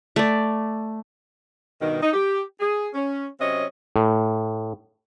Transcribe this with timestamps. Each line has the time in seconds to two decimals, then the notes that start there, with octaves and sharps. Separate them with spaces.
0.16 A3 D5
1.81 G2 B2 D#3
2.02 D#4
2.13 G4
2.60 G#4
2.94 C#4
3.40 C3 F#3 C4 C#4 D#5
3.96 A2